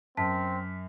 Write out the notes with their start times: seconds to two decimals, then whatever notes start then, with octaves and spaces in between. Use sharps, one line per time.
0.17 F#2 C4 A5 B6